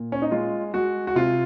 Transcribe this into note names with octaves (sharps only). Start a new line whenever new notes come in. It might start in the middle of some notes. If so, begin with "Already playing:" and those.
Already playing: A#2
C#4
D#4
G#3 F4
G#3 F#4
F#4
C3 F4